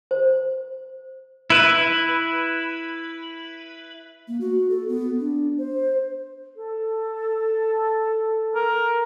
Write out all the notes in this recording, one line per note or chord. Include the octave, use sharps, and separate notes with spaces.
C5
E4 B4
A#3
F#4
A4
B3
D4
C5
A4
A#4